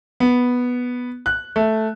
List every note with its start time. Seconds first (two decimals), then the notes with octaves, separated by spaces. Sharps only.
0.20 B3
1.26 F#6
1.56 A3